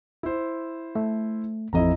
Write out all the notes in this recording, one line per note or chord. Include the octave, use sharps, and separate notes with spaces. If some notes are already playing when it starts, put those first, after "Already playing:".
E4 C5
A3
A1 F2 E4 D#5 A#5